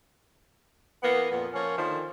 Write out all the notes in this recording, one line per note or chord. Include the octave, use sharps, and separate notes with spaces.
E3 A#3 B3
F2 A#2 B3
F3 A#3 C#4 C#5
D3 D#3 F3